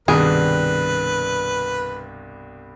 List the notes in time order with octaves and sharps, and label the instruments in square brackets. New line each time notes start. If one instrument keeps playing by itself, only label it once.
[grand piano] C2 G2 B2 [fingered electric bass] D#3 [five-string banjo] G#4 [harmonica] B4